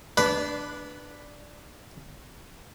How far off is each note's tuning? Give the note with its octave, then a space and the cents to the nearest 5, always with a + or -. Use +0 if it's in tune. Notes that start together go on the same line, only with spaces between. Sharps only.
D4 +0 B4 +0 D5 -30